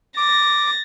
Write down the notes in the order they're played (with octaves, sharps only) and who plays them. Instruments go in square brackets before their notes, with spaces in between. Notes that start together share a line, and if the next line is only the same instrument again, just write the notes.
[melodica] D6 [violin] A6 A#6